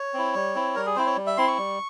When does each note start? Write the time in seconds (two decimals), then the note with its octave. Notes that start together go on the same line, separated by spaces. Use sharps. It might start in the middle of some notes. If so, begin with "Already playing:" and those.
Already playing: C#5
0.14 C4 E4
0.35 G3
0.55 C4 E4
0.76 G3 A#4
0.86 G#4
0.96 C4 E4 C5
1.06 C#5
1.16 G3
1.27 E5
1.37 C4 E4 C6
1.47 C#6
1.58 G3